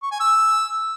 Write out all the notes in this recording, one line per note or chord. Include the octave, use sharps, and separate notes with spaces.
C#6
G#5
E6